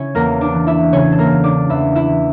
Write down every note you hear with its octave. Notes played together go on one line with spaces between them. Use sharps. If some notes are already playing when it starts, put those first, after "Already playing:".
Already playing: C#3 C#4 E4 C#5
E2 A#3 A#4
D4 D5
E3
E4 E5
C#3 C#4 C#5
A4
A#3 A#4
E2
D4 D5
E2 E4 E5
E4 E5
E3